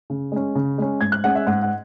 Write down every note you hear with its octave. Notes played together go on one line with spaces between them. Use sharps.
C#3
G#3 C#4
C#3
G#3 C#4
G#2 G#6
F#6
G#3 C#4 F#5
E5
G#2 F#5
F#5